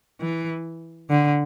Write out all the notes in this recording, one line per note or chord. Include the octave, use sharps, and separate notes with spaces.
E3
D3